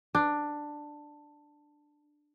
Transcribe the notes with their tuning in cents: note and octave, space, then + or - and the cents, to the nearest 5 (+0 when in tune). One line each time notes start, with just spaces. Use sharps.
D4 +10